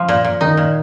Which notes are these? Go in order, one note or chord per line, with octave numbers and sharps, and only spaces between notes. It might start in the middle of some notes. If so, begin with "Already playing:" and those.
Already playing: F3
A#2
A#2
D#3 D#4
A#2